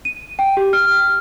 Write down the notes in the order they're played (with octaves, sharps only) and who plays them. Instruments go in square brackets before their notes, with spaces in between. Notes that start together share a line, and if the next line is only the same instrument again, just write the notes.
[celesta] D#7
G5
G4
F6